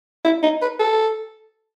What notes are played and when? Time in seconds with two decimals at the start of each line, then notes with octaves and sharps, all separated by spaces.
0.25 E4
0.43 D#4
0.61 B4
0.79 A4